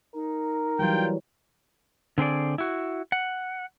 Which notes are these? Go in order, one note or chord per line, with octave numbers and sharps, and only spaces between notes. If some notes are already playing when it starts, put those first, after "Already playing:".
D#4 A#4
E3 F#3 G3 F4 G5
D3 C4 G#4 D5
E4 F#4
F#5